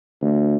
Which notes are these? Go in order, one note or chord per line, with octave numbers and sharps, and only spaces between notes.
D2